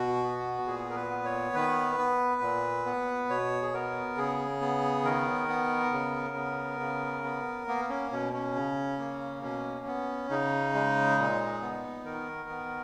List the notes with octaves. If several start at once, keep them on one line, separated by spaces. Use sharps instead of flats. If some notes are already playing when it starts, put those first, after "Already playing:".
Already playing: B2 F#4
B3
A#2 G#4
A#4
B4
B3
C#5
D#3 B4
B3
A#2
B3
B2 C#5
G#4
B3 A#4
C#3 G#4
B3
D#3 A#4
B3
C#3
B3
C#3
B3
A#3 B3
C#4
B2 C#4
C#4
C#3
A#3
B2 C#4
B3
C#3 D#4
G#3
A#2
B3
D#3 A#4
B3